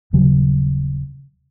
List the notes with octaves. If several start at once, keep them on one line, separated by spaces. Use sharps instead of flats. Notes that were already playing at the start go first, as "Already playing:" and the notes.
D#1 C#3 F#3 G3